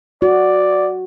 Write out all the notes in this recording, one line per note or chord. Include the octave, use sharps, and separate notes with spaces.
F#4 D5